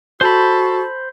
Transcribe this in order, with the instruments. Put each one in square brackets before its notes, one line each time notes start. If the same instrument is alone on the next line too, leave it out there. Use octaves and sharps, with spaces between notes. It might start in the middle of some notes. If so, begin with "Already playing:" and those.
[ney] F#4 [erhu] A4 [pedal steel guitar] C5 B5